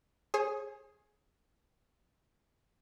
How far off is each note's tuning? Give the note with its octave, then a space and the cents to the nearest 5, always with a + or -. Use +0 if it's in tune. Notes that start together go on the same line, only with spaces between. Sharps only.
G#4 +5 C#5 -45